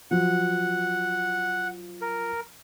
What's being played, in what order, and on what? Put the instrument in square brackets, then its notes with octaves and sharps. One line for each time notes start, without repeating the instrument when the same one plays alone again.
[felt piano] F3 F#3 [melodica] F#5
[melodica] A#4